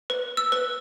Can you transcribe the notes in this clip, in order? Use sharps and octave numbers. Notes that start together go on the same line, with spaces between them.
B4
E6
B4